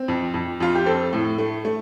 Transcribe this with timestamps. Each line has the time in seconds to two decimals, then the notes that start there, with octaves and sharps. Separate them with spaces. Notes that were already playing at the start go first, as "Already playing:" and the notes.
Already playing: C4
0.08 F2
0.34 F2
0.60 F2 F4
0.75 G4
0.86 C4 A4
1.13 A2
1.38 A3
1.65 A3